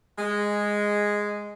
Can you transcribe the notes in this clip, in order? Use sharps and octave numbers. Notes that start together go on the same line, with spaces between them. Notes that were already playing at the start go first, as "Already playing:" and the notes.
G#3